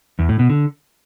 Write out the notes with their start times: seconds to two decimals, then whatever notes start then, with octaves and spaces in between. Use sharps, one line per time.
0.19 E2
0.29 A2
0.39 B2
0.49 D3